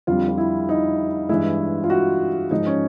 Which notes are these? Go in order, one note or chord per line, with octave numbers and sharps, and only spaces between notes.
F2 D3 G3 F4
F4
E4
D#4
G2 E3 G#3 E4
F4
F#4
G#2 F3 G#3 D#4
C#4